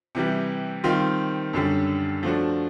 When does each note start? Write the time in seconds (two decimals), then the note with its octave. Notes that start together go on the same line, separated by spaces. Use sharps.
0.15 C3 E3 G3
0.84 D#3 G3 C4 F4
1.53 F#2 D3 G3
2.23 F3 A3 D4 F#4